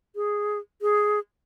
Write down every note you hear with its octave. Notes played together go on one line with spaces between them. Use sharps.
G#4
G#4